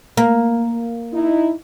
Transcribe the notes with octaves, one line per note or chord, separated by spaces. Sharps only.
A#3
D#4 E4